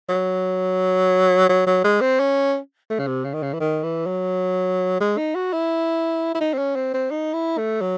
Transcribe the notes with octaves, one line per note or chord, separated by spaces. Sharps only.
F#3
F#3
F#3
G#3
C4
C#4
A3
C#3
C3
C#3
D#3
C#3
E3
D#3
E3
F#3
G#3
D#4
F#4
E4
E4
D#4
C4
C#4
C4
C4
D#4
E4
A3
F#3